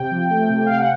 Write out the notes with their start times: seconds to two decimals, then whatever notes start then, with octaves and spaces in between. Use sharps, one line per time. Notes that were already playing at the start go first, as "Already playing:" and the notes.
Already playing: C3 G5
0.11 F3
0.30 A3
0.50 C3
0.66 C3 F5
0.78 F#5